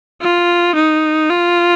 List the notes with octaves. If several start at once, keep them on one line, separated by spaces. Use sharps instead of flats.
F4
D#4
F4